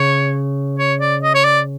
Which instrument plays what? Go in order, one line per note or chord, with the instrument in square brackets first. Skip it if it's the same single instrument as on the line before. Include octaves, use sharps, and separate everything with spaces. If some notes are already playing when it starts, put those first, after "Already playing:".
Already playing: [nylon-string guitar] C#3 [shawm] C#5
[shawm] C#5
D5
D#5
C#5
D5